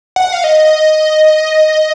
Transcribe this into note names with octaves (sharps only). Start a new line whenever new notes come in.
F#5
F5
D#5